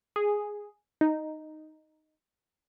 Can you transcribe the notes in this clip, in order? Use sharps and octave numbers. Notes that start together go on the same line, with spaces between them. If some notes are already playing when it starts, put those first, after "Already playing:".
G#4
D#4